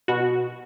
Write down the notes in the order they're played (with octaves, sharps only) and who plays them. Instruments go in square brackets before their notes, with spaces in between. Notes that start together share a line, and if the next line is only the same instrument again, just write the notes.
[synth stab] B2 F#4